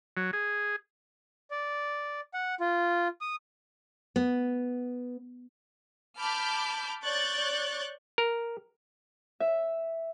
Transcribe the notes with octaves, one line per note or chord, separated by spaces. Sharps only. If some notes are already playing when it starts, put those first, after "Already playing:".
F#3
G#4
D5
F#5
F4
D#6
B3
A5 B5 D6 F6 G6
C#5 D5 C#6 F#6 G6 A6
A#4
E5